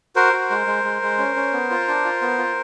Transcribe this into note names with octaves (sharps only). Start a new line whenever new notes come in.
F#4 A#4 C5
F#4
G#3
G#3
G#3
G#3
C#4
C#4
B3
F4
D4
F4
B3
F4